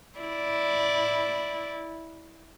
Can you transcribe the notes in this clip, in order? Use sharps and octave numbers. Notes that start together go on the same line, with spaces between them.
E4 D5